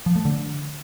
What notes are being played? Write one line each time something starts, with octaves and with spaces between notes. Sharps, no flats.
F3
A3
D3